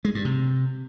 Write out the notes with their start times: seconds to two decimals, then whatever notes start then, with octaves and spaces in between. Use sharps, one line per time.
0.05 G#3
0.15 G2
0.25 C3